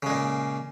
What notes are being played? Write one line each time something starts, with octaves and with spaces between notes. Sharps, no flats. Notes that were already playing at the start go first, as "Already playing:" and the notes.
A#2 C#3 G#3